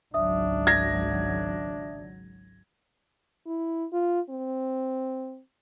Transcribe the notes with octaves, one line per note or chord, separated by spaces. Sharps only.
G#1 C#2 F#3 D4 E5 D#6
G#6 A#6
E4
F4
C4